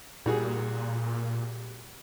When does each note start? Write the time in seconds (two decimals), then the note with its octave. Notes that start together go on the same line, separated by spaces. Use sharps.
0.26 A#2 G3 F#4 G#4